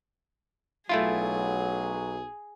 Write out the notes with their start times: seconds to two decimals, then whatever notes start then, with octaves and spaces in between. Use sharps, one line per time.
0.89 B1 F#3 A3 E4 F4 G#4